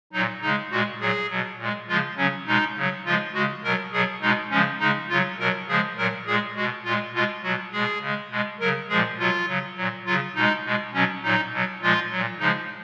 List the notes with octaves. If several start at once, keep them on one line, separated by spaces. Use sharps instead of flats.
A#2 F#3 D#4
C#3 G#3 D#4
A#2 G#3 F#4
A#2 F#3 G#4
B2 F#3
A#2 G#3
C#3 F3 G#3 F4
C#3 F#3 C#4
B2 G#3 D#4
C#3 F#3
C#3 F3 G#3 F4
C#3 G#3 F#4
B2 F#3 A#4
B2 F#3 G#4
B2 G#3 D#4
C#3 F3 G#3 C#4
C#3 G#3 D#4
C#3 F#3 F4
B2 F#3 A#4
C#3 F3 G#3 G#4
A#2 F#3 A#4
A#2 G#3 G#4
B2 G#3 F#4
A#2 G#3 F4
B2 G#3 F4
B2 F#3 F#4
B2 G#3 G#4
C#3 G#3
B2 G#3
C#3 F#3 A#4
A#2 F3 G#3 G#4
B2 F#3 F4
C#3 F#3
A#2 F#3
C#3 F#3 F4
B2 G#3 D#4
B2 G#3
B2 F#3 C#4
A#2 F#3 D#4
B2 F#3
A#2 F3 G#3 F4
A#2 F#3
C#3 F3 G#3 D#4